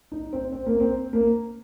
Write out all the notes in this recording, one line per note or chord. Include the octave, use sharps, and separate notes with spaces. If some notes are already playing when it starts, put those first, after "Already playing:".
D#4
C4
C4
A#3
C4
A#3